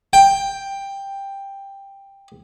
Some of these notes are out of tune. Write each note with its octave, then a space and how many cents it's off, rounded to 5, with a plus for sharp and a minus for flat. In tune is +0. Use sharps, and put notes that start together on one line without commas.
G5 +10